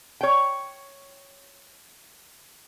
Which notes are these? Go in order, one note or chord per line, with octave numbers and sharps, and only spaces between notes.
C#5 G5